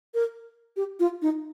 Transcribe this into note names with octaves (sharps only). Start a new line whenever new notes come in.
A#4
G4
F4
D#4